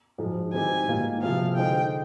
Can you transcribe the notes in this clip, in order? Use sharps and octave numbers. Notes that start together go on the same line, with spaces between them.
G#2 F3 G#3
D#3 G3 C4 D#4 G4 G#5
G#2 D#3 A#3 F4
C3 F3 C4 F4 G#4 F5
D3 G#3 D#4 G#4 C5 G5